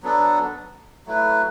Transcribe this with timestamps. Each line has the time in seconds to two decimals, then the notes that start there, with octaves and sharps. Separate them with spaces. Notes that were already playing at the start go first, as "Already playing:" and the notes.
0.03 F#3 B3 D4 A4
1.06 F#3 A3 E4 B4